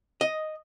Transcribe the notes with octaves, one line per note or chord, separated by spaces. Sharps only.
D#5